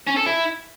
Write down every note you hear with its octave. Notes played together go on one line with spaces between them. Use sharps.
C#4
A4
E4